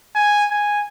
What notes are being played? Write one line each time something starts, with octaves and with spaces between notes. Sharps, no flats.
G#5
G#5